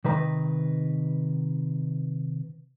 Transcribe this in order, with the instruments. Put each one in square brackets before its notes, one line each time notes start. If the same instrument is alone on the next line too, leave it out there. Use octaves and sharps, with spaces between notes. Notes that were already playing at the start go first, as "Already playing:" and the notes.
[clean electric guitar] C3 D#3 B4 A#5